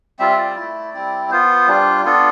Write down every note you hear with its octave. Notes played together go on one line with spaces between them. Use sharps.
G3 C4 F4 E5
D5
A3 E4
G3 C4 E4
B3 F4 C5
G3 D4 F4
B3 D4 F4 A4